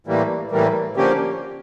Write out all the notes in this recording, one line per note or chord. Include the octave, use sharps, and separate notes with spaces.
A2 E3 G3 A#3
A2 E3 G3 A#3
D3 F3 A#3 C#4 G4